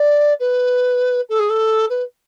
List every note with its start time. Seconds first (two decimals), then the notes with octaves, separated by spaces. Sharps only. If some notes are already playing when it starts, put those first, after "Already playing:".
Already playing: D5
0.39 B4
1.29 A4
1.39 G#4
1.49 A4
1.89 B4